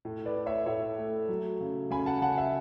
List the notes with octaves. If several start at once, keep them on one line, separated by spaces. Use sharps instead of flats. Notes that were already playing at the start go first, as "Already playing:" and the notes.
A2
B4 D5
A3
C#5 E5
A2 C#5 E5
A3
F#3
C#3
C#3 G#5 B5
F#5 A5
C#3 F#5 A5
E5 G#5